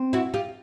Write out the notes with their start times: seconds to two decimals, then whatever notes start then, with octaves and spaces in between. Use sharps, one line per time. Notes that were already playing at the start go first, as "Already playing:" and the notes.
Already playing: C4
0.13 E4 F#4
0.34 F4 G4